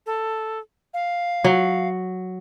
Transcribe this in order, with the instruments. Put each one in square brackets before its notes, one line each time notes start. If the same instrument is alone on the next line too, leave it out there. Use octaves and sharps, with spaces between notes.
[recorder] A4
F5
[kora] F#3